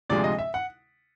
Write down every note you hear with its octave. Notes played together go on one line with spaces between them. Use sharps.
D2 C3 F3 G#3 D5
D#5
E5
F#5